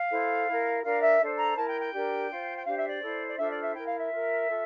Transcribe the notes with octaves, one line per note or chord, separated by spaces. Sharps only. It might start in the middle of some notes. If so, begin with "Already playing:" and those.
Already playing: F5
E4 A4 C5
E4 A#4
D4 F4 A#4 F5
E5
D4 A4 C5
A#5
E4 A#4 A5
G5
G5
D4 G4 A#4
F4 C5
G5
D4 G4 C5 F5
E5
D5
E4 A4 C5
D5
D4 F4 A4 C5 E5
D5
E5
E4 A#4 G5
F5
E5
F4 A#4
F4 A4